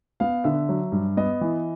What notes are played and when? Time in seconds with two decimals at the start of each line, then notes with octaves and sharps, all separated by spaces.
0.20 B3 F5
0.44 D3 E5
0.69 F#3
0.92 G2
1.17 B3 D#5
1.41 E3